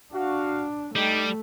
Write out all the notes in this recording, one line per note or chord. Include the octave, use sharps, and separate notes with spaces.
D4 F#4 F5
G3 A3 D#4 G4